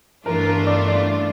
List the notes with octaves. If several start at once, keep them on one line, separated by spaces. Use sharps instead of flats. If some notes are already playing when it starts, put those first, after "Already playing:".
G2 E3 A3 D4 F4 A#4
A#4
D5
D5